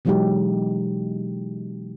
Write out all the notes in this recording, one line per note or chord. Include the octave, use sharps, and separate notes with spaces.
B2 E3 F#3 G#3 D#4 G4